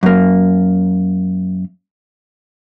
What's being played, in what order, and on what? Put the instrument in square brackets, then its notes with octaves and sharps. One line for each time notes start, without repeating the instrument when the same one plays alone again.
[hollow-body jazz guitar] F#2 A#3